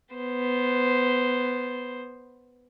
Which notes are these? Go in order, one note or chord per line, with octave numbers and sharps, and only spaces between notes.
B3 C5